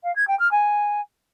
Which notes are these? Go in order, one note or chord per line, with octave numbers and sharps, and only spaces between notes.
F5
G#6
G5
F6
G#5